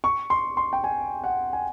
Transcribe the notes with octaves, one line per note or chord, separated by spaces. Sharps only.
C#6
C6
C6
G5
G#5
F#5
G#5